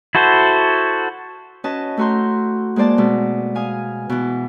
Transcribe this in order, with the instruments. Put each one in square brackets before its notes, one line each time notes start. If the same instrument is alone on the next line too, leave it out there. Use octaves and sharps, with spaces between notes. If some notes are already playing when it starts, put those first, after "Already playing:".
[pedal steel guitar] E4 F#4 A4 C5
[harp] C#4 F#4 B4 D#5 A5
A3 E4 F#4 A#5 C6 G6
G#3 A#3 C5 D5 A5
B2 G#3 A3
F5 G#5 D#6
B2 E3